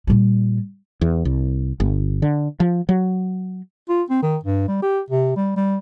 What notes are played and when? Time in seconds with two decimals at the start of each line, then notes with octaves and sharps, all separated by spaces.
0.07 A#2 G3
1.01 E2
1.25 C2
1.80 G1
2.22 D3
2.60 F3
2.89 F#3
3.89 F4
4.10 C4
4.23 D#3
4.44 G2
4.68 G3
4.82 G4
5.10 C3
5.36 G3
5.57 G3